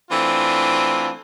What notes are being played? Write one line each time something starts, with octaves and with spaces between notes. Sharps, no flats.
E3 A3 C4 D4 F4